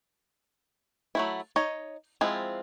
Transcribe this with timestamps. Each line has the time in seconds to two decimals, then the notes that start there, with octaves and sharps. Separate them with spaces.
1.15 F#3 A3 E4
1.56 D#4 C#5 D#5
2.21 F3 G#3 C4 E4 F4